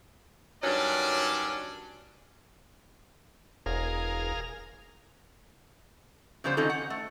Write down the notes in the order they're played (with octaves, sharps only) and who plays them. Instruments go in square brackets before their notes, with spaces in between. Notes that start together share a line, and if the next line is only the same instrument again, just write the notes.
[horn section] G2 D#3 F#3 C#4 D4 D5
[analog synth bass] E1 [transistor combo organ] G#4 A#4 F5
[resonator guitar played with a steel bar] C#3 F3 G3 B3 C5
D#3 C4 C#4 D#4 F4 A4
F#5
A3